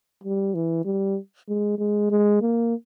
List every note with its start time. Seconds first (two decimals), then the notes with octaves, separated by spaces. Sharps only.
0.24 G3
0.55 E3
0.85 G3
1.49 G#3
1.79 G#3
2.11 G#3
2.42 A#3